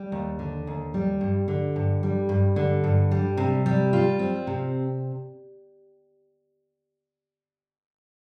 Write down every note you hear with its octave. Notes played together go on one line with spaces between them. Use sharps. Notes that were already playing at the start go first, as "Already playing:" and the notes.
Already playing: G3
D#2
D3
D#2
G3
G2
D3
G2
G3
G2
D3
G2
G3
C3
G3
F4
C4
C3